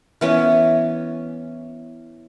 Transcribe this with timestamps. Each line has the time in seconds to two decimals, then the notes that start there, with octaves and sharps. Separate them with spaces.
0.21 E3 B3 C#4